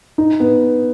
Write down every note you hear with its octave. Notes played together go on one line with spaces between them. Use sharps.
D#4
B3